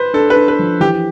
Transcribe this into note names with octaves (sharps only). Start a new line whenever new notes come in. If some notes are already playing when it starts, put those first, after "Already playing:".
Already playing: B4 C5
D4 A4
B4
D4
B4
F3
E3 G4